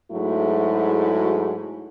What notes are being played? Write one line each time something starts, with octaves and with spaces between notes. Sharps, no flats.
G#2 F#3 A3 E4 F#4 G#4